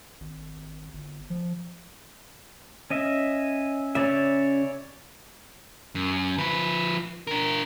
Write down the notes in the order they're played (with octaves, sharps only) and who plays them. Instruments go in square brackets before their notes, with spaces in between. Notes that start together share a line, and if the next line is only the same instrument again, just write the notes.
[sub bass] G#1
G1
F3
[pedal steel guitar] C#4 D#5 E5
[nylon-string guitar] C#3 [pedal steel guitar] C#5 D5 E5
[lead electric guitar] F#2
F3 B4
D4 A#4